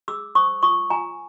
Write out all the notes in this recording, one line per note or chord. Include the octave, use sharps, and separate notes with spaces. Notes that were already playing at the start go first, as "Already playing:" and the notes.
G#4 D6 E6
C5 C#6 D#6
F4 C#6 D#6
F4 G#5 A#5